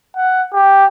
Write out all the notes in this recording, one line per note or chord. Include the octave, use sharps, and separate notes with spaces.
F#5
G4